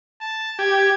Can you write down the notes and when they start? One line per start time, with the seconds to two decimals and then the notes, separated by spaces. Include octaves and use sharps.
0.21 A5
0.59 G4 G#6